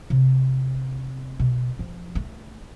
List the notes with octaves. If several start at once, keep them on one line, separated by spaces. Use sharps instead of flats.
C3 C4
B2
F3
A3